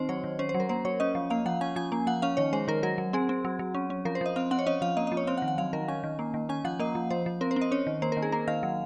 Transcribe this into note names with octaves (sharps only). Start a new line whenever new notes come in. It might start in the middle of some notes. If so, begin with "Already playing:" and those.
Already playing: D#3 C4 C5
F#3 C#5
D#3
C#4 C5
C5
F#3
A#4
A#3 C5
F#3 C#5
C#4 D#5
F3
A#3 F5
F3 F#5
C#4 G#5
F3 G#5
A#3
F3 F#5
C#4 F5
D#3 C#5
G#3 C5
D#3 A#4
F#3 A#4
F#3
C4 G#4
C4
F#3
F#3
C#4
C#4
F3 A#4
C5
F3 D#5
C4 F5
C4 F#5
C#5
C#4 D#5
F3 F5
A#3 D#5
D#5
F3
C#5
C4 F5
F#5
D#3
F#5
F#3 F5
D#3 A#4
C#4 G#5
D#3
A#3
D#3
C#4 G#5
F3 F#5
A#3 D#5
F3
F3 C5
F3
C4 A#4
C5
C4
D#5
C#4 C#5
D#3
A#3 C5
A#4
D#3
G#4
A#3 A#4
D#3 F5
F#3